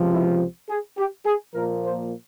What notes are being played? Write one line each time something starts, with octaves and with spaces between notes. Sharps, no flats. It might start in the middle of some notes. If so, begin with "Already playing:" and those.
Already playing: C#2 C3 F3
E4
G#4
G4
G#4
A#2 F3 A#3 A#4
C5